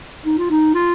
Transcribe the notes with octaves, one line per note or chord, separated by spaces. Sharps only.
D#4
F4
D#4
F4